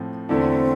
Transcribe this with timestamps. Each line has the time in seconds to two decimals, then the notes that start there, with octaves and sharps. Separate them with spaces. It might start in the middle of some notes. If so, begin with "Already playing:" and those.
Already playing: A2 F3 C4
0.29 E2 D3 A3 C4 E4